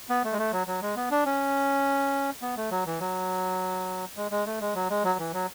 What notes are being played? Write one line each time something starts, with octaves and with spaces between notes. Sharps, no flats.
B3
A3
G#3
A3
F#3
F#3
G#3
B3
D4
C#4
B3
A3
F#3
E3
F#3
G#3
G#3
A3
G#3
F#3
G#3
F#3
E3
F#3